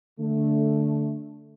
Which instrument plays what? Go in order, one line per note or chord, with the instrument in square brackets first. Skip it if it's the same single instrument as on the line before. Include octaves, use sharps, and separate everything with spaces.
[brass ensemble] D3 A3